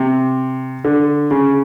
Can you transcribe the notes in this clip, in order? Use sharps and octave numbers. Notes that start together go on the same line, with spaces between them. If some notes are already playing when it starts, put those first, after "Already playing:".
Already playing: C3
D3
C#3